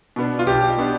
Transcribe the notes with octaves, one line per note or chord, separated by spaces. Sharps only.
B2 B3 D4
F4
B1 G4
B2 B3 D4